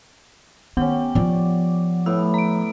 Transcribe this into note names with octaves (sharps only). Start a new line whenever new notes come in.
D#3 B3 C#4 G4 F#5
F3 F4 D5
A2 B3 E6
A#5 D7